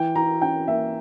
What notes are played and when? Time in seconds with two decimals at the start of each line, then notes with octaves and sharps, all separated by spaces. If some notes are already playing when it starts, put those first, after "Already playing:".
Already playing: E3 G5
0.15 E3 A#5
0.42 C#4 G5
0.67 A#3 E5